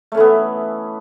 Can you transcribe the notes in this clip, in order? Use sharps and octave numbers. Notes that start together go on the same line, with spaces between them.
E3 A3 B3 C#4